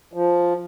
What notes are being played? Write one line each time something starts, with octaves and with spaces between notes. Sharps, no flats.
F3